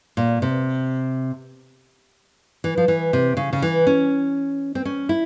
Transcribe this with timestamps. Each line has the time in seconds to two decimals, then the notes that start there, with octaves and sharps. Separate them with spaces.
0.17 A#2
0.42 C3
2.64 E3
2.77 F3
2.88 E3
3.13 C3
3.37 C#3
3.53 C#3
3.62 E3
3.87 C#4
4.75 C4
4.85 C#4
5.09 E4